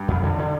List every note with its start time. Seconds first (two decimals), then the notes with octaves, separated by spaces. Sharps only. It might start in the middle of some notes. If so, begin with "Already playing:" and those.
Already playing: G2 G3
0.08 F2
0.23 D3
0.38 D3